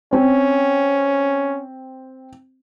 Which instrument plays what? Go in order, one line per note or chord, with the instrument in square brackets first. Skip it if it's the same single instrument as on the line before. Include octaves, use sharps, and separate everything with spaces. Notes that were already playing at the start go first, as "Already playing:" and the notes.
[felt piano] C4 [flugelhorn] C#4